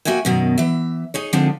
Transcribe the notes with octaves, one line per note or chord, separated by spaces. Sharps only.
A#3 F#4 E5 G5 G#5
F#2 B2 D#3
E3 E5
D#4 G#4 C#5
D3 F3 G#3 C4 D4 D#4